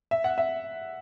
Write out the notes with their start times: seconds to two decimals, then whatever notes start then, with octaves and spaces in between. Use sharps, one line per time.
0.11 E5
0.24 F#5
0.38 E5